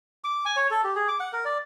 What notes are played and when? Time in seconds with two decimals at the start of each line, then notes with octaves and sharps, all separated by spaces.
0.24 D6
0.45 G#5
0.57 C#5
0.71 A4
0.84 G4
0.96 G#4
1.08 D6
1.20 F#5
1.33 A#4
1.45 D5